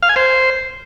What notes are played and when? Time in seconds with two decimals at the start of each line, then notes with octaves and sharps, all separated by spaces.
0.03 F5
0.09 G#5
0.16 C5